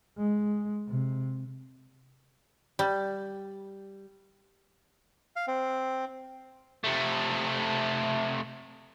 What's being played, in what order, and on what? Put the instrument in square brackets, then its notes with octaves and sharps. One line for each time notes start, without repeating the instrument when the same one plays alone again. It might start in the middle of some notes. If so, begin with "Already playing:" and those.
[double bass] G#3
C3
[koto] G3
[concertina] F5
C4
[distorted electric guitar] C3 A3